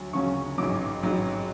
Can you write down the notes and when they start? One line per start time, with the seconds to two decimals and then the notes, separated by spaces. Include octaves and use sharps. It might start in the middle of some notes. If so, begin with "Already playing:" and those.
Already playing: D2 F#3
0.13 D2 C#3 F#3 C#4 C#6
0.58 A1 G#2 F#3 D6
1.03 A1 G#2 F#3